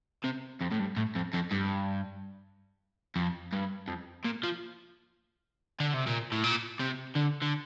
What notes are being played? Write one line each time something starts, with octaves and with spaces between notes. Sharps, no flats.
C3
F2
A2
G2
A2
F2
F2
G2
F2
G2
F2
A#2
F3
D3
C3
A#2
A2
A#2
C3
D3
D3